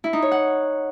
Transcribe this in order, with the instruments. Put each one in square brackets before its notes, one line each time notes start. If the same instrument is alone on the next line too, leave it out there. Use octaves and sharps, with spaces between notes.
[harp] E4
D#4
C#5
F#5